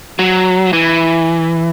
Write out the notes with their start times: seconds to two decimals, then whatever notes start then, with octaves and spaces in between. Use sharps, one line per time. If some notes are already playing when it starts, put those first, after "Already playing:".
0.19 F#3
0.73 E3